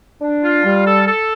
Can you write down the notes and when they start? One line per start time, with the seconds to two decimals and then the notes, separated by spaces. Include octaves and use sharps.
0.21 D4
0.44 F4
0.64 G3
0.86 A4
1.07 A4